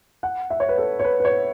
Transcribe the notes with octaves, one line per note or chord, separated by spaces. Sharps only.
F#5
E5
C#5
B4
A4
C#5
B4
B4
C#5